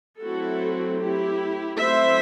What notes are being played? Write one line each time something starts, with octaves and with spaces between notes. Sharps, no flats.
F#3 A3 C4 E4 F#4 A4
E4 G4
F#3 A3 C4 E4 C5 E5